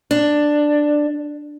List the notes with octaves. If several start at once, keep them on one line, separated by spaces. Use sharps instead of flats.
D4